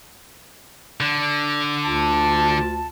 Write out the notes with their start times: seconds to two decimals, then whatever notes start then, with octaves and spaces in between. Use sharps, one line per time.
1.00 D3
1.85 D2 F4 A5